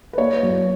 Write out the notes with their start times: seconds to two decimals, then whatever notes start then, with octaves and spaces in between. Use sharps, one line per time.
0.13 B4
0.18 A#3 C#5
0.43 F#2